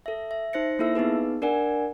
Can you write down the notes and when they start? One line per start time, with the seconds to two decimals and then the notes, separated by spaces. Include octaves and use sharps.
0.06 A4 E5
0.31 E5
0.53 D#4 C5 A#6 C#7
0.79 A#3 E4 A4 E5 E6
0.95 B3 D#4 G#4 B4
1.42 D4 A#4 D5 F#5 G#5